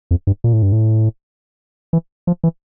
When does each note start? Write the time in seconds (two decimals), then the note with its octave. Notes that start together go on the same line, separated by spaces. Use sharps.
0.11 F2
0.27 G2
0.44 A#2
0.53 A2
0.63 G2
0.72 A2
1.93 E3
2.27 F3
2.44 E3